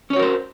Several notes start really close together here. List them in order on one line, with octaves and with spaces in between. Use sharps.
C#4 C#5 F#4 A#4 C5